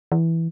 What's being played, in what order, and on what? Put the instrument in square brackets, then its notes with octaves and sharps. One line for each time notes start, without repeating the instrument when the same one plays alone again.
[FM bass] E3